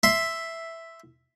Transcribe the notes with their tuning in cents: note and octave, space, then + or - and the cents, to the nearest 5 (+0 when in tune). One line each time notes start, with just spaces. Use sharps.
E5 +0 C6 +0